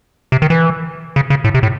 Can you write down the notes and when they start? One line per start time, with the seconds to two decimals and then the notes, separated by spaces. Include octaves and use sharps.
0.32 C3
0.42 D#3
0.50 E3
1.16 C#3
1.30 C#3
1.44 A2
1.54 C3
1.63 A2